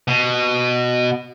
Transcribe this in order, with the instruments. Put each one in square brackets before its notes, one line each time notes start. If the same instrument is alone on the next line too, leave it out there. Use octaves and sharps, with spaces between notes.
[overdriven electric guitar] B2